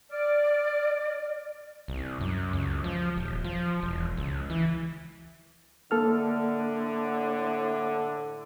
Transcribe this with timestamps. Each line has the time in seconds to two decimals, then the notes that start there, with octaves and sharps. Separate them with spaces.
0.10 D5 F6
1.88 C2
2.21 F#2
2.53 C#2
2.84 F3
3.17 D#1
3.44 F3
3.83 E1
4.17 C#2
4.50 E3
5.91 A2 D3 A#3 A4 F6